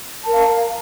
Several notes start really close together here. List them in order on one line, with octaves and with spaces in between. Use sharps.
A5 A#4 F5